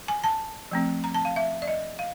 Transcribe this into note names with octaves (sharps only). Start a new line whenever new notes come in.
G#5
A5
F3 A3 C4
A#5
A5
F5
E5
D5
D#5
F5